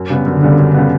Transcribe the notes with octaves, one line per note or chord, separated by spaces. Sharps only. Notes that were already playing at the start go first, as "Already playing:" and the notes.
Already playing: F#2
C#3 G3 B3
F#2 D3
C#3 G3 B3
F#2
C#3 G3 B3